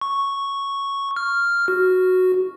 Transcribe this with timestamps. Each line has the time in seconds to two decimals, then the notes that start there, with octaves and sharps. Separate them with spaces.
0.01 C#6
1.16 F6
1.68 F#4